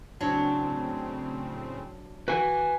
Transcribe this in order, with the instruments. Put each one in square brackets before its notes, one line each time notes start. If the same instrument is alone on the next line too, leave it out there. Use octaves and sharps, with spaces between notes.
[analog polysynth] A2 C#3 C4 [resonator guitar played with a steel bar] F#3 D4 C#5
[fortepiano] F#4 [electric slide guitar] B4 G#5